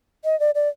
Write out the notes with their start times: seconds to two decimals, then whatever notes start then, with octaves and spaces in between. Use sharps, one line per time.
0.25 D#5
0.40 D5
0.55 D5